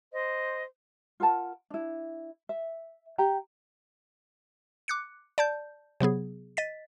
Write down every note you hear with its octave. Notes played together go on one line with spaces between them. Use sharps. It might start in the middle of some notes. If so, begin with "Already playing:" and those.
C5 D#5
F4 A#4 F#5 A5
D4 E4
E5
G4 G5 A#5
D6 F#6 C#7
D5 A5 G6
C3 F#3 B3 G#4
D#5 A6 B6